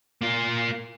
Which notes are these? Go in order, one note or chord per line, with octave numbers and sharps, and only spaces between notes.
A#3 F4